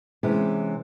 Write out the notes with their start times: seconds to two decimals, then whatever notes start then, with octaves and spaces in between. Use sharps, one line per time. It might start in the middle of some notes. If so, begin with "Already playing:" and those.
0.23 C3 E3 G#3 B3 C#4